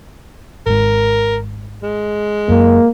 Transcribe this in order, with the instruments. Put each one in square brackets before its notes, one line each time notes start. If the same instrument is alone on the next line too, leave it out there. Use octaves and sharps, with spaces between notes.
[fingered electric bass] G#1 G#2 [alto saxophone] A#4
[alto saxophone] G#3
[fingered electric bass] F#2 [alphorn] A#3